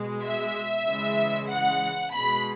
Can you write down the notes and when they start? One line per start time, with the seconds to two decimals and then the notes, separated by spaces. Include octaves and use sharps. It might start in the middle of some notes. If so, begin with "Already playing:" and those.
Already playing: B2 G#3
0.23 E5
0.86 C#3 E3 G#3
1.49 F#5
2.12 B2 B5
2.18 G#3